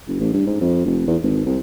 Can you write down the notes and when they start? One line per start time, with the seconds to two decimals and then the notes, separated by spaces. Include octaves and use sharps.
0.07 F#1
0.20 A1
0.33 G2
0.46 G#2
0.61 F2
0.86 F1
1.07 E2
1.23 G#1
1.45 C2